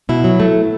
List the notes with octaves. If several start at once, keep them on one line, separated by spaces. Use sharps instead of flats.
B2 E4
F#3
A3